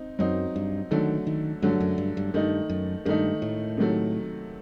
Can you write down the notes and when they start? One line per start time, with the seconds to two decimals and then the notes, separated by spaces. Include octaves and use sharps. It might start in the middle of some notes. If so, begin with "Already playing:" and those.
Already playing: C4 D#4
0.19 F#2 F#3 C4 D#4
0.56 G2
0.91 D3 D#3 F#3 A3
1.27 D#3
1.62 G2 D3 F#3 A3
1.80 F#2
1.98 G2
2.17 G2
2.34 G2 D#3 A3 D#4
2.70 F#2
3.05 G2 D#3 A3 D#4
3.42 A2
3.77 C3 D#3 F#3 A3